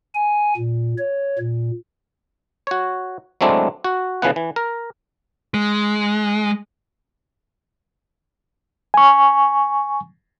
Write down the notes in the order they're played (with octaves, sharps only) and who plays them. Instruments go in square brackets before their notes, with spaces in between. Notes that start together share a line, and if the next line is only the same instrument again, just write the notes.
[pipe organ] G#5
A#2
C#5
A#2
[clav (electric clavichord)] F#4 C#5
F#3 G#3 A3 C4 D4 E4
F#4
C#3 E3 F3 B3 F#5
E3
A#4
[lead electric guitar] G#3
[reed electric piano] G#5 C#6